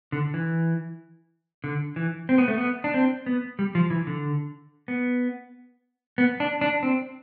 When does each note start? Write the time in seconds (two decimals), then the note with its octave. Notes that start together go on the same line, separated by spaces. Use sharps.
0.12 D3
0.34 E3
1.64 D3
1.96 E3
2.29 C4
2.38 B3
2.48 A3
2.58 B3
2.84 D4
2.94 C4
3.26 B3
3.59 G3
3.75 F3
3.90 E3
4.07 D3
4.88 B3
6.18 B3
6.40 D4
6.61 D4
6.83 C4